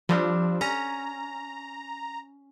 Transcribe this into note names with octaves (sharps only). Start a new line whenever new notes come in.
F3 G3 C4 D4
C#4 A#5